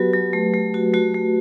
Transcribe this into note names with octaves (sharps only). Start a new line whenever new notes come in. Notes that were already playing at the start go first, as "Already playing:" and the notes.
Already playing: F#3 B3 F#4 G4 B4
F#3
A3
A3
F#4
A3 F#4
A3